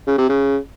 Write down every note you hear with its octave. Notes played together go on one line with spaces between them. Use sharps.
C#3
C3
C#3